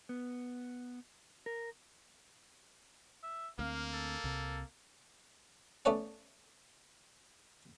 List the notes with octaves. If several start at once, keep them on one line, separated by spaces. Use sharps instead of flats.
B3
A#4
E5
D2 A3 A#3 C4 F5
A4
C2 C3
A3 B3 C#4 C#5 D5 F#5